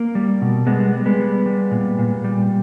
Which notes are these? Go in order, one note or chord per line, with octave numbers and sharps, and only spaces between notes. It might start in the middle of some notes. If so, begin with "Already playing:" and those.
Already playing: A#3
G3
B2
G3 G#3 B3
G3
G#3 B3
G3
G3
A#2
A#2
G3